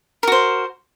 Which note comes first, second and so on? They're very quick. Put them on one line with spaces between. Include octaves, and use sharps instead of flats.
A#4 F#4 C5